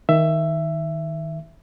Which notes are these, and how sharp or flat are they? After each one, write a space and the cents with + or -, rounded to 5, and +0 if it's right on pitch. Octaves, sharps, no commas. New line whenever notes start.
D#3 +15 E5 +15